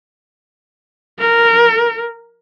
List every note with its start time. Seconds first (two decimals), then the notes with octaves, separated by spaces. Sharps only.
1.20 A#4